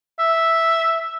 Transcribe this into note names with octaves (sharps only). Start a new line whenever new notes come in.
E5